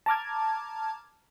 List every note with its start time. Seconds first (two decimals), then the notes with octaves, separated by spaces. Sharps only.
0.06 A5 A#5 D6 F6 G#6